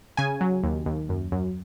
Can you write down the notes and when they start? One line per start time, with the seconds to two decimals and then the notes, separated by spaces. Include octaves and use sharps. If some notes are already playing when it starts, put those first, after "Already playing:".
0.17 C#3 G#5
0.41 F#3
0.63 D#2
0.86 D#2
1.09 F#2
1.32 F#2